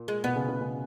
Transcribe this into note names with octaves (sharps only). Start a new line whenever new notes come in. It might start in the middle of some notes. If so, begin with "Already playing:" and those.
Already playing: A#2
G#3
B2 B3
C#3
C#3
C#3